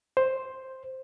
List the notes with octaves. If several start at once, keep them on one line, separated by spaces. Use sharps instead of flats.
C5